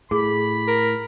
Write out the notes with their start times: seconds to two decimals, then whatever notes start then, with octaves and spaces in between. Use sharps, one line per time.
0.11 A2 G#4 B5
0.67 A#4